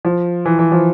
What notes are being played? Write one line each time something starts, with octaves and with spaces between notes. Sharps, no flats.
F3
E3
E3
F3